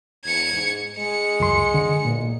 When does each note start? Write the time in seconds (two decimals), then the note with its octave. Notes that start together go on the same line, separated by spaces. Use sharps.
0.25 E2 G#6 C#7
0.53 G#2
0.98 G#3 C#7
1.40 C#2 F#2 C6
1.74 D3
2.05 B1 A#2